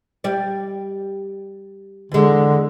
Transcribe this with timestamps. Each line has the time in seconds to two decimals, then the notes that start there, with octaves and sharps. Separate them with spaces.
0.24 G3 D5
2.12 E2 D3 G#3